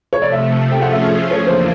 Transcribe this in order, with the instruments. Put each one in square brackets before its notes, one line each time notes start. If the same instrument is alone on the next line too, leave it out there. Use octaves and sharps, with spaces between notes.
[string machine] C3 F3 A3 [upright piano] C#5
[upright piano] D5
E5
[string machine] F3 A3 C#4 F4 G#4 [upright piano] G5
[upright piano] F#5
E5
[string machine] E2 C#3 F3 A#3 D4 [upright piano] C#5
[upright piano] C5